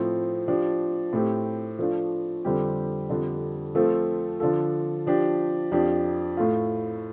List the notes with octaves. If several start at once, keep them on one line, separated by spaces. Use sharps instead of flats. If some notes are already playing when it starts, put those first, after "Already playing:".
Already playing: A2 F3 C4
F3 D4 G4
A2 A3 C4 G4
F3 A3 D4 F4
F2 D3 G3 C4 G4
F2 D3 G3 D4
F3 A3 C4 F4 A4
D3 F3 D4 F4 A4
F3 D4 G4
F2 F3 D4 G4
A2 A3 F4